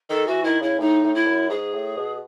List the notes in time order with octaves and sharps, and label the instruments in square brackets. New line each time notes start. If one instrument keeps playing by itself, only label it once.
[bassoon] D#3 [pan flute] A4
[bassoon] E3 [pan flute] F#4
[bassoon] D#3 [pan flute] E4
[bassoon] C#3 [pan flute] E4
[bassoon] A2 [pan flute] D#4
[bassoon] A2
[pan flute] E4
[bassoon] F#2
[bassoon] G#2 [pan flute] G#4
[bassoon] A2
B2